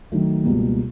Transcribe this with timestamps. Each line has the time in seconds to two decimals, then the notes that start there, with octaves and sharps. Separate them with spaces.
0.12 D#3 F#3 A3
0.44 C#2 B2 G3 A#3